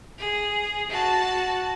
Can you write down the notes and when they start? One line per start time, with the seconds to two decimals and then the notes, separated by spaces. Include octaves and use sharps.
0.19 G#4
0.90 F#4 A5